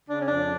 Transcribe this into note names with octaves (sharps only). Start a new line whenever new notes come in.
C#3 D4
C#4
F2 D4